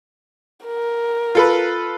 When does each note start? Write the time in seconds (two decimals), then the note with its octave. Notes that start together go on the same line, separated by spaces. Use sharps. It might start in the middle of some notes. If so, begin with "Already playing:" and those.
0.65 A#4
1.35 F4 A4 B4